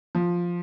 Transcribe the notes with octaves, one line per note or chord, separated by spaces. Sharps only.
F3